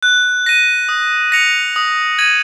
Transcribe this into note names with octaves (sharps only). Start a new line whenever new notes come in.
F#6
A#6 D#7
D#6
A#6 C#7 F7
D#6
G#6 D#7 F#7